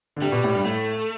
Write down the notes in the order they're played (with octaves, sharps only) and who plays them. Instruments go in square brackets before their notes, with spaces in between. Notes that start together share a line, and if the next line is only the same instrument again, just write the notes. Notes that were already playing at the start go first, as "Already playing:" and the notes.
[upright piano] D3
[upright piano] C3 [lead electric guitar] G3
[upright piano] B2
A2
G2
[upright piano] A2 [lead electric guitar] A3